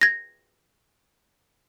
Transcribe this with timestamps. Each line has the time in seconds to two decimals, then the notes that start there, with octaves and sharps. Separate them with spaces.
0.01 G#6 A#6